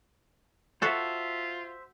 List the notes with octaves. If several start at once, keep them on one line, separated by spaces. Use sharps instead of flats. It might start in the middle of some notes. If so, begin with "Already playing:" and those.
F4 F#4 A4 C5 E5